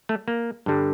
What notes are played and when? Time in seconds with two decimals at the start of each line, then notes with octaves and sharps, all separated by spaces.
0.09 A3
0.28 A#3
0.66 G2 D3 G3